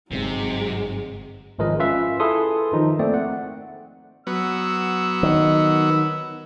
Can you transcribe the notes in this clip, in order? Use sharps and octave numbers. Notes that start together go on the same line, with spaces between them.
G1 G#2 C3 F#3 G#3 C4
G#1 F3 G#3 A#4 B4 D#5
C#4 F4 B4 E5 F5
E4 G#4 A4 B4 C6 D#6
D#3 F3 D#4
A3 A#3 C4 D5
F#5
F#3 B3 E6
D#3